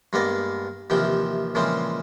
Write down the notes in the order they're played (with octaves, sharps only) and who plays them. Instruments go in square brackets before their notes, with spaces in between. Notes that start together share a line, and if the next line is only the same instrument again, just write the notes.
[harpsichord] G2 G#3 A#3 B3 D5 D#5
D#2 C3 E3 F3 G5
A#2 C#3 E3 F3 G#3 C4